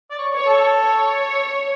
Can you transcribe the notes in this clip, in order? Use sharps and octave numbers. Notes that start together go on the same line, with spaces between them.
D5
C#5
C#5
A4
C#5